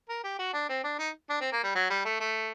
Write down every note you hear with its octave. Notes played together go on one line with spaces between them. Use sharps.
A#4
G4
F#4
D4
C4
D4
D#4
D4
C4
A#3
G3
F#3
G3
A3
A3